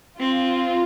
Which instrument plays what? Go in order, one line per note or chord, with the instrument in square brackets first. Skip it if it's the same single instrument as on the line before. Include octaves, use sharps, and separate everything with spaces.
[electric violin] C4 [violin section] F4